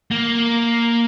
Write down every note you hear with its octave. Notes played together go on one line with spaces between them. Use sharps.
A#3